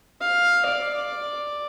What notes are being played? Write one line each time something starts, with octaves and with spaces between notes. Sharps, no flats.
F5
D5